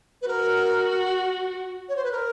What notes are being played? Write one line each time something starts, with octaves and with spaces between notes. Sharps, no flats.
B4
F#4 A#4
C#5
C5
B4
A#4